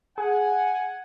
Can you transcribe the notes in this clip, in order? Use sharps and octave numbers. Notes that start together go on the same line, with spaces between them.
G#4 F#5 G#5